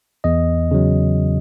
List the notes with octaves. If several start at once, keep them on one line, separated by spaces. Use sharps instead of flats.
E2 D#5
C#3 F#3